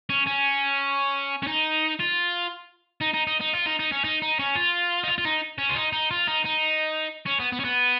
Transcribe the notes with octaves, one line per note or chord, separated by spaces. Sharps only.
C#4
C#4
C#4
D#4
F4
D#4
D#4
D#4
D#4
F4
D#4
D#4
C#4
D#4
D#4
C#4
F4
D#4
F4
F4
D#4
C#4
F4
D#4
D#4
F4
D#4
D#4
C#4
B3
B3
C#4
B3